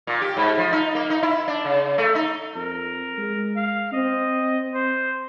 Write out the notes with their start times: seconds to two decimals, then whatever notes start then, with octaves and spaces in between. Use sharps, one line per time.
0.07 A#2
0.22 G4
0.37 G#2
0.58 F3
0.73 D#4
0.95 A#3
1.10 D#4
1.23 E4
1.48 D4
1.65 C#3
1.98 A3
2.15 D#4
2.55 F2 A#4
3.18 G#3
3.56 F5
3.93 C4 D#5
4.74 C5